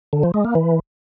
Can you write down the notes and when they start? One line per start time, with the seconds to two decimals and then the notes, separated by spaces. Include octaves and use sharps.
0.13 D3
0.23 F3
0.34 G#3
0.45 A#3
0.55 E3